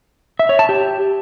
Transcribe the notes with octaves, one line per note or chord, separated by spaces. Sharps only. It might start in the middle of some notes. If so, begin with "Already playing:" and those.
E5
C#5
A5
G4